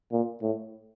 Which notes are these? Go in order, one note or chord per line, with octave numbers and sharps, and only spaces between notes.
A#2
A2